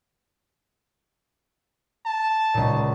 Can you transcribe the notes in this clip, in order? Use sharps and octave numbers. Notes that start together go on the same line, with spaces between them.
A5
C#2 A#2